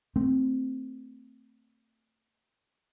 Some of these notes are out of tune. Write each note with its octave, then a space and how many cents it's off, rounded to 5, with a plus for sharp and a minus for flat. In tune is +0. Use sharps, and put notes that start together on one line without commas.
A3 +25 C4 +0